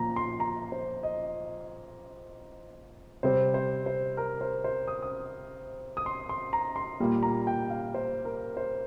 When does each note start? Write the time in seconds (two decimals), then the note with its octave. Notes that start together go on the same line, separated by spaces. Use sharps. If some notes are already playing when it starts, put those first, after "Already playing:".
Already playing: A#2 F3 A#5
0.16 C6
0.40 A#5
0.72 C5
1.03 D#5
3.23 C3 G3 C4 C5
3.54 C5
3.86 C5
4.17 A#4
4.41 C5
4.64 C5
4.88 D#6
5.02 D#6
5.97 D#6
6.06 C6
6.29 C6
6.53 A#5
6.76 C6
7.00 A#2 G3 A#3
7.23 A#5
7.47 G5
7.70 F5
7.94 C5
8.25 A#4
8.57 C5